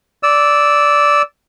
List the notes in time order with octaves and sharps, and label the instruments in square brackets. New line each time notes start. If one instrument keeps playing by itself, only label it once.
[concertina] D5 E6